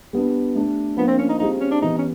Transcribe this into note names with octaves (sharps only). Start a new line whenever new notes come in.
G3 B3 D4
A3 D4 G4
F3 A#3 B3 D4 F4
C4
C#4
D#4
G3 C4 D#4 F4 G#4
C#4
D4
E3 G3 B3 D#4 E4
C#4